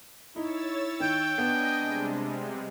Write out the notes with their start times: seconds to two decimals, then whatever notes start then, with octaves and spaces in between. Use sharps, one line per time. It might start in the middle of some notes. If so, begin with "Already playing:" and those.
0.36 D#4 E4 C#5 E6 A6
1.00 D#3 G5
1.38 B3 D4 D#5 G#5
1.76 C3 G3 G#3